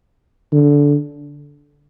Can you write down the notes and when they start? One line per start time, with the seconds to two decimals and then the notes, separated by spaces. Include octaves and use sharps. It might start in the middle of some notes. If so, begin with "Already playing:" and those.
0.52 D3